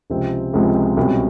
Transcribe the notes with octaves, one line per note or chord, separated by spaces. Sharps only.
C#2 C3 F3 G#3 C4
C#2 C3 F3 G#3 C4
C2 B2 G#3 C#4